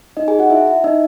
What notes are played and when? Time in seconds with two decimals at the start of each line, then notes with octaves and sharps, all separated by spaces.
0.17 D#4 D#5
0.28 G#4 G#5
0.39 F#4 F#5
0.50 E4 E5
0.67 E4 E5
0.84 D#4 D#5